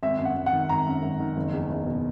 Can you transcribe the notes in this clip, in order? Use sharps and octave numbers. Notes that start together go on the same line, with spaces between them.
G#1 E5
F#2
F#5
G#1
F#5
D#3
G#1 A#5
F#2
G#1
D#3
F#1
E2
F#1
B2